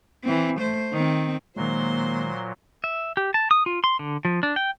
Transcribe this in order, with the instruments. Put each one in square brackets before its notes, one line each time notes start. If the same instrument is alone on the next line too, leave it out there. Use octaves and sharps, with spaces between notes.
[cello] E3 C4
A3 C5
D#3 C4
[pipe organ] A#2 F#3 [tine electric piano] D#3 G#3 [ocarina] A#3 [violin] C5 C6
[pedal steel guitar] E5
G4
A5
D#6
F4
C6
D3
F3
D4
G5